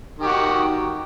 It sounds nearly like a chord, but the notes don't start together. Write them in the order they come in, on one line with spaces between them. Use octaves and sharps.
D#3 G4 F#4